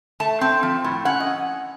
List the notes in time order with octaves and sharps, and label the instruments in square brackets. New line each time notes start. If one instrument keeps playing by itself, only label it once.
[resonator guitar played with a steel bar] A3 A5
C4
F3
A2
C#4 F#5
D#5